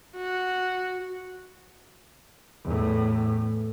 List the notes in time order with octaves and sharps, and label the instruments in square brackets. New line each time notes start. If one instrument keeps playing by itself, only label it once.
[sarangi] F#4
[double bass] E2 A2